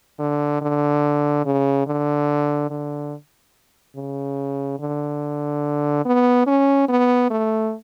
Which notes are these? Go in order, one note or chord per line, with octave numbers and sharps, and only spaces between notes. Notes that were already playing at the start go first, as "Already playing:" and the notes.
D3
D3
C#3
D3
D3
C#3
D3
B3
C#4
B3
A3